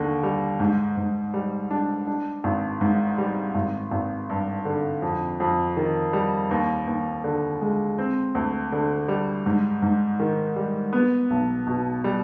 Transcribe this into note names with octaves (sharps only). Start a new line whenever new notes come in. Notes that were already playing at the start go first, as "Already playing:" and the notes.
Already playing: D#2 D3
G3
G#2
G#2
G3
D4
D4
G#1
G#2
G3
G#1
G#1
G2
D3
F2
F2
D#3
G3
D#2
D#2
D3
G#3
C4
D2
D3
G3
G#2
G#2
D#3
G3
B3
B1
B2
G3